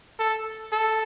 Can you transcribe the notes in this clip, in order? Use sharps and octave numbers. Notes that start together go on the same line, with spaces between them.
A4
A4